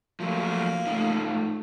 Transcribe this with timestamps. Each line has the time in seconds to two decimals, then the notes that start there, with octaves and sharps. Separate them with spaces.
0.20 F3 F#3 A3 A#3
0.86 G#2 A3 D#4 F4